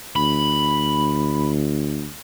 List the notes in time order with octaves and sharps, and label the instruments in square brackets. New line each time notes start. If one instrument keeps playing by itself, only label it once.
[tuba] D2 [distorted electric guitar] B5